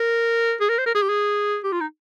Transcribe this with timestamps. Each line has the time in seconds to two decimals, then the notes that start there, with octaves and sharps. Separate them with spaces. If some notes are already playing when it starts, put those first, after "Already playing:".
Already playing: A#4
0.61 G#4
0.69 A#4
0.79 C5
0.86 A#4
0.95 G#4
1.02 G4
1.09 G#4
1.64 G4
1.72 F4
1.81 D#4